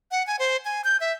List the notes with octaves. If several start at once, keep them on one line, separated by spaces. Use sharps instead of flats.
F#5
G#5
C5
G#5
G6
E5